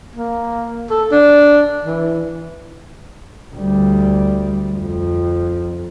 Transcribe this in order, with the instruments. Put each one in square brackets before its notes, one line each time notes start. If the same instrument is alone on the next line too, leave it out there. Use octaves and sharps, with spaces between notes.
[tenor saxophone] A#3
A4
D4
E3
[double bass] D2 G3
F2